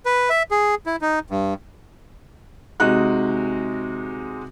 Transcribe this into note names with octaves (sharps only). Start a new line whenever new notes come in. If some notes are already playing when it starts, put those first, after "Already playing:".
B4
E5
G#4
E4
D#4
G2
C3 G#3 D#4 F#4 F#6